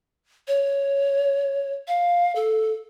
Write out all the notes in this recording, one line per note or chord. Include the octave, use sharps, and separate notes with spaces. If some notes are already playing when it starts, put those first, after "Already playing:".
C#5
F5
A4